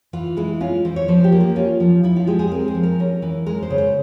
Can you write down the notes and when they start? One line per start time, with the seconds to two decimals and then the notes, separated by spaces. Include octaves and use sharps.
0.13 E3 F4
0.37 G#3 E4
0.60 C#4 F4
0.85 E3 C5
0.96 C#5
1.08 F3 C5
1.24 G4
1.32 A#3
1.40 F4
1.56 C#4 F4
1.80 F3
2.03 F3 E4
2.16 F4
2.27 G#3 G4
2.39 G#4
2.52 C4 A#4
2.68 C5
2.75 F3
2.83 A#4
2.99 C#4 A#4
3.22 E3
3.46 G#3 A#4
3.63 C5
3.70 C#3
3.78 C5